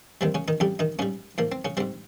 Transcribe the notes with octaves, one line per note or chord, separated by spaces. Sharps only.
D#2 D#3 G3 C4
C#3 C#4
D#3 D#4
F2 C#3 G3 G4
D#3 D#4
G#2 C#3 G3 C#4
G#2 F3 A#3
C4
C#3 C#4
G#2 G3 C4